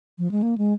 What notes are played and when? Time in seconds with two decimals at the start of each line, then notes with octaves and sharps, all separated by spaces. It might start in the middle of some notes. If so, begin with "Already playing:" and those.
0.18 F3
0.31 G#3
0.42 A#3
0.58 G#3